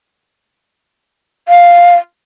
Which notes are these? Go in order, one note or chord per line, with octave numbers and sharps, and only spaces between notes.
F5